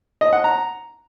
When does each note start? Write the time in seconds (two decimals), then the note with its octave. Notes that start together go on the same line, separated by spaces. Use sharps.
0.21 D#5
0.33 F#5
0.44 A#5